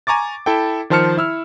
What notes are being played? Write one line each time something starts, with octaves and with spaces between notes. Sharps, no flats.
G#5 A#5 C#6 D6 A6
E4 A4 E5 G5
D#3 F3 C5 A5 F6 C#7
E4 E6 F6